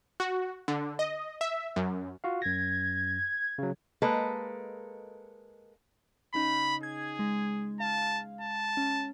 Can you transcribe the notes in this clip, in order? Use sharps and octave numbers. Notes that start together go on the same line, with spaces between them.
F#4
D3
D#5
E5
F#2
F4 F#4 F5
F#2 G#6 A#6
C#3 F#3
G#3 A#3 A4 B4 D#5
C#3 C#4 D#4 B5
G#4 G#6
G#3
F5 A5
A5
C#4